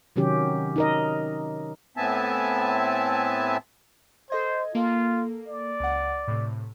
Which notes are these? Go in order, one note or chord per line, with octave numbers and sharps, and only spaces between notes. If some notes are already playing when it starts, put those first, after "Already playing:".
C3 D#3 F#3 C#4 G4
D#4 A#4 D#5
A2 B3 C4 E5 G#5 A5
A4 C5 D#5 G#6
A#3 F4 A4
D5
C#2 F#5
A2 C3